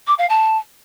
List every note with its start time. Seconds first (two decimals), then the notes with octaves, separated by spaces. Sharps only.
0.07 D6
0.18 F5
0.29 A5